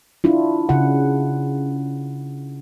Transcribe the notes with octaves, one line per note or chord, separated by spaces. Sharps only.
D4 E4 F4
C#3 F#5